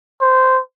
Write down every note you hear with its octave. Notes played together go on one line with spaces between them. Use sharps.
C5